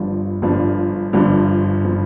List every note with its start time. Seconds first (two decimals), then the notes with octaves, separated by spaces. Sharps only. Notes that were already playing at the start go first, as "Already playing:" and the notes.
Already playing: G1 G2 D3 F3
0.42 G1 G2 D3 F3
1.13 G1 G2 D3 F3
1.84 D3 F3